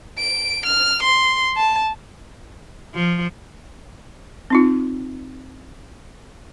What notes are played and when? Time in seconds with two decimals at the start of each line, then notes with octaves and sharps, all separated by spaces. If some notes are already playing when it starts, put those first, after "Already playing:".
0.19 D7
0.66 F6
1.03 C6
1.57 A5
2.94 F3
4.50 C4 D#4 F4